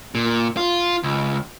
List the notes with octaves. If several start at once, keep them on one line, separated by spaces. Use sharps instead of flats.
A#2
F4
C#2